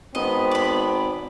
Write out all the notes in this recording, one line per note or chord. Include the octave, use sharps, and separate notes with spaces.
G#1 B3 C4 D#5
D5 B5